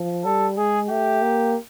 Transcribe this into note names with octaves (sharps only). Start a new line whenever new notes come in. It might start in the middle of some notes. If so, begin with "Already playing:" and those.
Already playing: F3
G3 A4
G#3 G#4
A3 G4
A#3